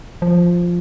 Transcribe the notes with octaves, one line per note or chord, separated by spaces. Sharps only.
F3